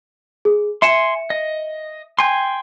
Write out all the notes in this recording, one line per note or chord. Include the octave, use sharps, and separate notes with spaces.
G#4
E5 G#5 C6 C#7 E7
D#5
G5 G#5 C6